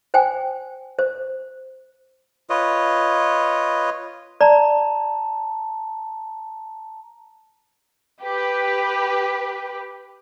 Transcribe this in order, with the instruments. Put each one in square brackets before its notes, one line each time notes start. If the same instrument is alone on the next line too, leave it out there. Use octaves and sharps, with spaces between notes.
[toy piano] C5 G5 G#5
C5
[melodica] F4 B4 C#5 D#5
[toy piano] D5 [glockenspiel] A5 A#5
[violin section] G4 B4